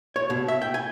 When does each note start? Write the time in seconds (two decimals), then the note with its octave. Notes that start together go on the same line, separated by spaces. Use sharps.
0.16 C#5
0.30 B2
0.48 E5
0.62 G5
0.74 G#5